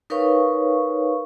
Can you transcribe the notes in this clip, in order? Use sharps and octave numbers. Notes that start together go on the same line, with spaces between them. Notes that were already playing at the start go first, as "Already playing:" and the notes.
D#4 A#4 B4 C#5 F5 C#6